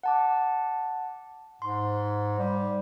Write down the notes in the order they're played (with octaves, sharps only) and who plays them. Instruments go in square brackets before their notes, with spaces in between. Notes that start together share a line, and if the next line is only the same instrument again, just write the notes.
[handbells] F#5 A5 D6
[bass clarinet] G#2 [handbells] C6
[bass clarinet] G3